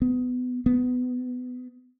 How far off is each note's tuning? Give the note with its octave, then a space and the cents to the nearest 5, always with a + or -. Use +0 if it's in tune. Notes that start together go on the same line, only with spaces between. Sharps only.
B3 +20
B3 +20